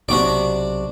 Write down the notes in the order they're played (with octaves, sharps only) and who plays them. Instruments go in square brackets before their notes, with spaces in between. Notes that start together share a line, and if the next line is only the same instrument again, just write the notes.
[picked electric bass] B1 C3 [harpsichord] D4 F#4 D5